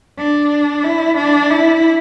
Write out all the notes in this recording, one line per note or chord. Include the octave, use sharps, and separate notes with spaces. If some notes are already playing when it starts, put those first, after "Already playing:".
D4
E4
D4
E4